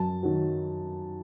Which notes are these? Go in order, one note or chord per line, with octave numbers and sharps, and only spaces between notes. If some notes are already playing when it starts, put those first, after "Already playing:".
Already playing: F#2 A5
D#3 F#3